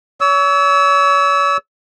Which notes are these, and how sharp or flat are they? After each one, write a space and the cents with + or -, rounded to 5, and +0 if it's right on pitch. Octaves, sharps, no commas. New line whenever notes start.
C#5 +40 E6 -15